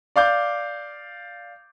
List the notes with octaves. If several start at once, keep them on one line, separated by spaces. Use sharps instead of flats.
D5 F5 D6 G6